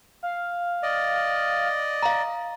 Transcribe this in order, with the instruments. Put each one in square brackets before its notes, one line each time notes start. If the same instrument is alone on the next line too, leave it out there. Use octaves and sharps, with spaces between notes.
[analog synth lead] F5
[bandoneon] D5 D#5
[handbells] F5 A#5